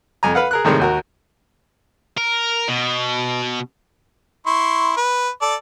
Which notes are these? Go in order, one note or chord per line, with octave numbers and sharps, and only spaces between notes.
F2 G#5 A#5
B4 F5 F#5
G#4 A#4 F#6
A2 C3 D#3 G3 G#3
D#2 F#4 A#4
A#4
B2
E4 C6 C#6
B4
A4 D5